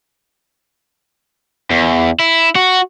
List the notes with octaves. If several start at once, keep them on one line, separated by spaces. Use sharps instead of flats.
E2
E4
F#4